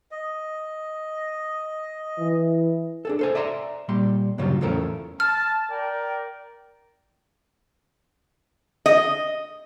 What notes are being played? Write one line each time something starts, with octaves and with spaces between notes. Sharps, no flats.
D#5
E3
D4 G#4 A4
A4 C5 G#5
D5 E5 G#5 A#5 C6
A#2 G3 C6
G2 A#2 C#3 F#3 G3 F4
E2 A2 F3 A3 C#4 A#4
A5 F6
A#4 D5 G5
D#5